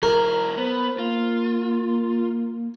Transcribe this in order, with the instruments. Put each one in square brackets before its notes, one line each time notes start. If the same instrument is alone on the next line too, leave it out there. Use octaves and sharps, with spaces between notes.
[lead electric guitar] F#3 E4 [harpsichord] A#4
[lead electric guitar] B3 [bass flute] C5
[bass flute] A#3 [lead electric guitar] F4